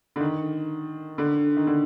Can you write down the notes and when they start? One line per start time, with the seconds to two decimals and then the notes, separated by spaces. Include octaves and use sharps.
0.16 D3
0.20 D#3
1.18 D3
1.57 D#3
1.67 D3